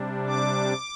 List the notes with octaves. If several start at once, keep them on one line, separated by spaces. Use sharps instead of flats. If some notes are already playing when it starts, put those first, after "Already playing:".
Already playing: C3 G3 D4
D6